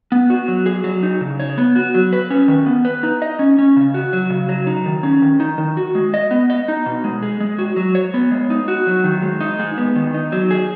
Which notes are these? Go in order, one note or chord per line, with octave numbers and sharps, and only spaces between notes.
B3
F#4
F#3
G#4
F#3
D#4
C#3
C#5
B3
F#4
F#3
B4
C#4
D#3
B3
B4
D#4
D#5
C#4
C#4
C#3
F#4
F#3
C#3
F#3
D#4
D#3
C#4
D#3
D#4
D#3
F#4
G#3
D#5
B3
D#5
D#4
B2
G#3
G#4
G#3
F#4
F#3
C#5
B3
G#3
D#4
F#4
F#3
D#3
G#3
D#4
G#3
B3
D#3
D#4
F#3
G#4